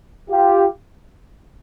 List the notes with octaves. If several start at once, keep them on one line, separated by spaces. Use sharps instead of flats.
F4 G4